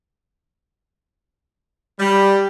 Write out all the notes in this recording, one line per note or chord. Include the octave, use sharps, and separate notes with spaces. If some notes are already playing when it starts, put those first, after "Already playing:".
G3